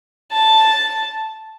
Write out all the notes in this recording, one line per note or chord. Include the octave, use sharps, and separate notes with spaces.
A5